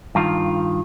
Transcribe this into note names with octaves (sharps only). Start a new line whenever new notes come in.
G2 D#3 F4